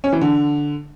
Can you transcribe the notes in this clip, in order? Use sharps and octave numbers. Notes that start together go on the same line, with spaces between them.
C#4
E3
D3